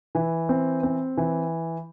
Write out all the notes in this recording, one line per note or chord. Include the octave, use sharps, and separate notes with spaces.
E3
C4
C4
E3